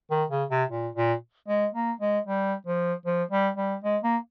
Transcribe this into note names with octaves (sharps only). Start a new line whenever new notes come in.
D#3
C#3
C3
A#2
A#2
G#3
A#3
G#3
G3
F3
F3
G3
G3
G#3
A#3